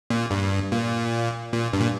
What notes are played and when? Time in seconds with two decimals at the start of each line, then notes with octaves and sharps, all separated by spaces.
0.10 A#2
0.31 G2
0.72 A#2
1.53 A#2
1.73 G2
1.81 A#2